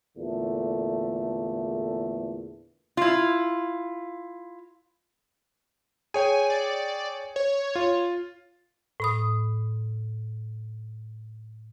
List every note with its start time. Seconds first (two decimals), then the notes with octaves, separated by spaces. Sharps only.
0.17 E2 A#2 D3 A3
2.97 E4 F4
6.14 G#4 C#5 G5 G#5
6.50 D5
7.36 C#5
7.75 F4
9.00 A2 B5 D#6